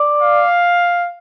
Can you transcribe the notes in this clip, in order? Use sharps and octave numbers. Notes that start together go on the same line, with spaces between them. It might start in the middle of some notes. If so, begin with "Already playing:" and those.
Already playing: D5
F5